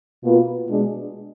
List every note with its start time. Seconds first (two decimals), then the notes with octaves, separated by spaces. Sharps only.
0.22 B2 A#3 F4 B4
0.66 B2 G#3 D4